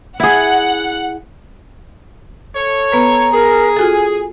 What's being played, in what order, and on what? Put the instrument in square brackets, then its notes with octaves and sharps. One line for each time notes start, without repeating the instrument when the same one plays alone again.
[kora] E4 G#4 [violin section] F#5
[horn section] A4 C#5
[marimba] B3 B4 [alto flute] A#5
[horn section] G#4 [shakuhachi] A#4
[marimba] F4 F#4 A4 [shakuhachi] G#5